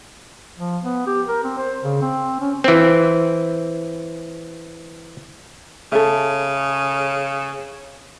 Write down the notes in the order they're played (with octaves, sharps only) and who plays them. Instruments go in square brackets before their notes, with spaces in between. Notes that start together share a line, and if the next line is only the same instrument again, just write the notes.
[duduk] F3
B3
G4
A#4
C4
C5
C#3
C4
C#4
[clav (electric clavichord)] E3 C4
[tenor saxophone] C#3 [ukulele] A4 E5